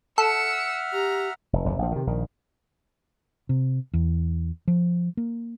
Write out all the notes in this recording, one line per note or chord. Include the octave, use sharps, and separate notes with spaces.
A4 E5 F#5 E6 F6 C#7
G4 A#5
F1
F1 D#2
A#1 F3
C3 D#3
A#1 D#3
C3
E2
F3
A#3